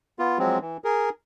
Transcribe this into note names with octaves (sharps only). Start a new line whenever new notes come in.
B3 F4
F3 F#3 G#3 C4
E3
G#4 A#4